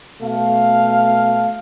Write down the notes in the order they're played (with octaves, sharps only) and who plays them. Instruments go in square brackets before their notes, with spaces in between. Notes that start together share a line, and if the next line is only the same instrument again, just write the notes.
[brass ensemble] B2 A3 F5